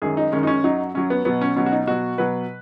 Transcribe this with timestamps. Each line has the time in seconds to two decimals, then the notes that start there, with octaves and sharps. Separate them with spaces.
0.02 F#2 D#3 G#3 G#4
0.17 D#4
0.32 F#2 D#3 G#3 C#4
0.43 D#4
0.47 C#4
0.64 F#2 F#3 D#4
0.94 F#2 F#3 C#4
1.10 B3
1.25 B2 F#3 B3
1.41 C#4
1.56 B2 F#3 C#4
1.66 F#4
1.72 D#4
1.87 B2 F#3 F#4
2.18 B2 F#3 B4